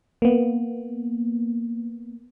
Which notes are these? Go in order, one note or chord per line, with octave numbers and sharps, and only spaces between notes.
A#3 B3